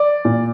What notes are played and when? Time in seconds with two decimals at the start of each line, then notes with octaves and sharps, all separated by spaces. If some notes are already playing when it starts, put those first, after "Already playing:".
Already playing: D5
0.25 A#2